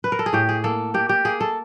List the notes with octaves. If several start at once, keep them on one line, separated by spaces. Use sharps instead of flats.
B4
A#4
A4
G#4
A2 G4
G#4
A#3 A4
A#3 G4
G4
A#3 G#4
A4